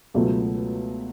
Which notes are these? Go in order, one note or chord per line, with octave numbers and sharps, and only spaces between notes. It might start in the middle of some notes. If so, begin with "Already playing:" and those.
C#2 B2 F#3 A3